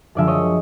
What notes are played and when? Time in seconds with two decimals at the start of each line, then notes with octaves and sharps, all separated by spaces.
0.15 F#2 D3 F3 G#3 D5 E5
0.27 C#5 D#5